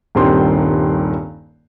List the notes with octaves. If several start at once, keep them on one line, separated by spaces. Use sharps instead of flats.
D#1 G2 D#3 C4 C6